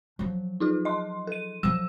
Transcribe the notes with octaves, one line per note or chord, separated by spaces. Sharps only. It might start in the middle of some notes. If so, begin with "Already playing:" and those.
F3 F#3
D#4 F4 G#4
D#5 C6
A4 D#7
F3 F#3 E6 E7